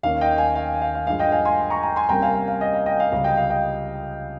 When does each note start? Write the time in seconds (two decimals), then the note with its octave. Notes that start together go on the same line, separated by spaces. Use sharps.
0.03 D#2 D#3 A#3 C#4 F5
0.21 D#5 G5
0.38 F5 G#5
0.55 F5
0.82 F5
0.94 F5
1.06 G2 F3 G#3 F5
1.19 D#5 G5
1.32 F5 G#5
1.45 G#5 C6
1.70 A#5 C#6
1.83 G5 A#5
1.96 G#5 C6
2.09 C2 C3 G3 A#3 C#4 G5 A#5
2.22 F5 G#5
2.35 F5
2.48 F5
2.61 D#5
2.74 F5
2.86 D#5 G5
3.00 F5
3.12 C#2 C3 G3 C4 F5
3.24 D#5 G5
3.37 F5
3.50 D#5 G5